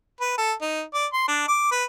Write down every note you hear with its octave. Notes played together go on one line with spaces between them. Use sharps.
B4
A4
D#4
D5
C6
D4
D6
B4